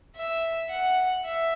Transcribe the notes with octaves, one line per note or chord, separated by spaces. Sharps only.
E5
F#5
E5